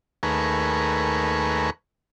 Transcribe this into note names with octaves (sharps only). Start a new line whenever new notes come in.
D#2 A3 G#4 A#4 B4 C#6